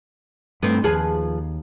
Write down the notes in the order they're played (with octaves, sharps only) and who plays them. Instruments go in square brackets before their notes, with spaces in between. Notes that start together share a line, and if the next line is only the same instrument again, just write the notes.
[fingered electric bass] G2 A3 [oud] B3 C4
[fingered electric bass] D#2 [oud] F3 G#4 B4